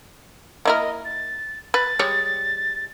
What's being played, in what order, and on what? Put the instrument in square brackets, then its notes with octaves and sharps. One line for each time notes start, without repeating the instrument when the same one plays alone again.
[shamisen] A#3 E4 A#4 [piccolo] D#5
[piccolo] A6
[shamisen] B4 [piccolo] A6
[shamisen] G3 G#3 C#5